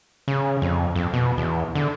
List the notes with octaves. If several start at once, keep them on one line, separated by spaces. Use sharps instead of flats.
C#3
F2
F2
B2
E2
D3